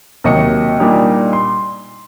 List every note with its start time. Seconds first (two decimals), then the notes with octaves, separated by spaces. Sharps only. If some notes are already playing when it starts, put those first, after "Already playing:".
0.24 D#2 C3 F#3 D#5 C#6 C#7
0.79 A#2 G3 D4 D#4 G4
1.33 C6